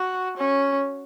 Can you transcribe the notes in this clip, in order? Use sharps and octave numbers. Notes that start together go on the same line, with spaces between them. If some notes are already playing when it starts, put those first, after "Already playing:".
Already playing: F#4
C#4